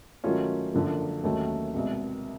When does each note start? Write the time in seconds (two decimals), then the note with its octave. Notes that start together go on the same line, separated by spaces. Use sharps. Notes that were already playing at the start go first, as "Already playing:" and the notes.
0.24 D#3 F#3 A3 C#4 F4
0.74 F#2 D3 F3 A#3
1.24 D#2 D#3 F#3 A3 C#4
1.74 C2 B2 G#3